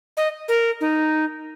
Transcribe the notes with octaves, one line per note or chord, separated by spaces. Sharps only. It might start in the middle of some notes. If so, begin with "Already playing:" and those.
D#5
A#4
D#4